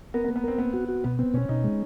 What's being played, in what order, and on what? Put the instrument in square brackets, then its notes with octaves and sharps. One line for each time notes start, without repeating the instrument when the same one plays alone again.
[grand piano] B3 [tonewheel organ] A#4
[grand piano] B3
[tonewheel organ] A#3
[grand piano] B3
[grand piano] C4 [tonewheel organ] A#4
[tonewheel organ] A#3 [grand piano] B3
[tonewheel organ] F#4
F#4
[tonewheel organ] B2 [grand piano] B3
[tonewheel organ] B3 [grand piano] C4
[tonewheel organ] B2 [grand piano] C#4
[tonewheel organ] B2 [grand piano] D#4
[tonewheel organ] G#3